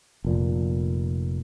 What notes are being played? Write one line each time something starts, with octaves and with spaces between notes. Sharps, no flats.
F1 A#2